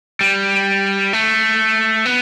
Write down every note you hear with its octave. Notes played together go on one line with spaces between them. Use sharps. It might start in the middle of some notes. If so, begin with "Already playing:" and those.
G3
A3
B3